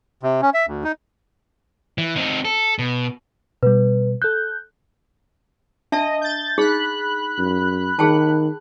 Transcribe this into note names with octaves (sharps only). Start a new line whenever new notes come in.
C3
C#4
E5
D2
D#4
E3
C4 D#4
A4
B2
B2 G3 B4
A4 F#6 G6
D4 D#5 E5 A5
G6 A6
D#4 G#4 B5 F#6
F#2
D#3 G#4 G5 A5